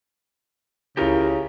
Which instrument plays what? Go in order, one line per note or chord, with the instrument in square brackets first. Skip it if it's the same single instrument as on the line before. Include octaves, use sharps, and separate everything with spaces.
[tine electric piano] C#2 E4 F4 [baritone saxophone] C#3 [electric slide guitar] G4 A#4